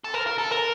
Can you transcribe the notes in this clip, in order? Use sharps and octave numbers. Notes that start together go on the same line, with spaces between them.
A4
A#4
A#4
A4
A#4